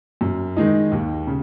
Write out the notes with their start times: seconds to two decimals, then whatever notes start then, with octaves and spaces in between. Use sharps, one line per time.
0.21 F#2
0.57 D#3 G#3 D#4
0.92 D#2
1.27 C#3